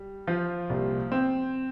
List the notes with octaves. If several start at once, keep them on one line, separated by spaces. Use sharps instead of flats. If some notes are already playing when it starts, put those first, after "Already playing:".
Already playing: G3
F3 F4
C2 A#2 G3
C4